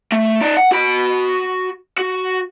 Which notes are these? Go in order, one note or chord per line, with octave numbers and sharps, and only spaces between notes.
A3
D#4 D5
F#5
F#4 B5
F#4